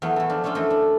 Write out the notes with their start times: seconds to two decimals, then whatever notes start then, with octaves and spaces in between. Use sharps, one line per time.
0.02 E2 F#3 A3 B3
0.16 E3 A3
0.29 F3 D4
0.44 A3 C#4 D4 F4 A4
0.55 F#2 E3 A3 A4 C5 D#5
0.70 D4